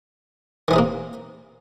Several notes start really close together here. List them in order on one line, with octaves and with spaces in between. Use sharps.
D#3 E3 D#4 C3 A#3